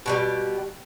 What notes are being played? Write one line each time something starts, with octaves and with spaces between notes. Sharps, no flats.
B2 D3 G3